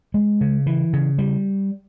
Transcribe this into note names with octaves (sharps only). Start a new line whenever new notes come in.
G#3
C#3
E3
C#3
G3